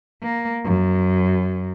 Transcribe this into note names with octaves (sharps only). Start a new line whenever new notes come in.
A#3
F#2